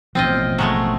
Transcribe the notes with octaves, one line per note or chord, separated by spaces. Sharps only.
A1 B2 F3 C4 F4 D#5
F#3 G#3 A3